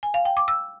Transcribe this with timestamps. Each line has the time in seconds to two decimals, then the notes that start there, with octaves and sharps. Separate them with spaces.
0.03 G#5
0.14 F5
0.25 G5
0.37 D6
0.48 E6